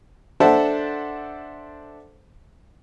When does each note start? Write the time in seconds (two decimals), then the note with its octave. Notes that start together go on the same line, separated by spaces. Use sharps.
0.40 D4 A4 C5 E5 F#5 A5